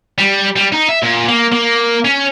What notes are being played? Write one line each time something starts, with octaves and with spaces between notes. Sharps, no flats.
G3
G3
D#4
E5
A#2
A#3
A#3
C#4